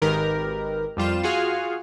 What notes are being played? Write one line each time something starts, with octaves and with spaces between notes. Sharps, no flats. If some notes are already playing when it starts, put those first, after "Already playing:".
G#1 D#3 G4 A#4 B4
F2 G3 F4 E7
F4 F#4 G#4 F5